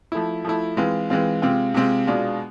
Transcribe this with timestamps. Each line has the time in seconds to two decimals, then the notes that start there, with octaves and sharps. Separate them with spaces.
0.12 F3 A3 E4
0.44 F3 A3 E4
0.77 E3 G#3 C4 F4
1.10 E3 G#3 C4 F4
1.42 C3 G#3 C4 F4
1.74 C3 G#3 C4 F4
2.07 B2 G#3 D4 F4